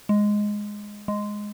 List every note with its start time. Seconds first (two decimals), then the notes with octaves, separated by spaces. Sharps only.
0.09 G#3
1.08 G#3